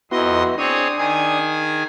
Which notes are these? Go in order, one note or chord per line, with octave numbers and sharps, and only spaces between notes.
F2 B3 E4 F#4 D#5 C6
C4 D4 G#4 C#5 D#6
D#3 G#4 G#5